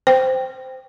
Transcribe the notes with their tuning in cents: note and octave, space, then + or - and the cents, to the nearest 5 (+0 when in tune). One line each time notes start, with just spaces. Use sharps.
C5 -10 G5 +0